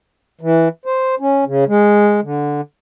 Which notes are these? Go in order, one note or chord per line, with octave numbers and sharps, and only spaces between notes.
E3
C5
C#4
C#3
G#3
D3